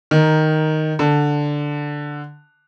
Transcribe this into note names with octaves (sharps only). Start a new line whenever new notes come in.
D#3
D3